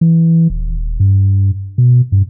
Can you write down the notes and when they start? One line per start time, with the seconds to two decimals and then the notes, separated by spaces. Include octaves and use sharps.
0.01 E3
0.50 D#1
1.00 G2
1.78 B2
2.12 G2